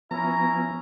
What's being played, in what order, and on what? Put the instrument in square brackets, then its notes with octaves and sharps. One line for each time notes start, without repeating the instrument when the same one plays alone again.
[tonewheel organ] F3 B3 [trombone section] C#4 E4 [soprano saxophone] A#5